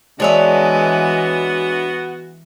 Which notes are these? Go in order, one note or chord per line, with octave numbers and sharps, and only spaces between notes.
E3 G#3 B3 D4 F#4 C#5 E5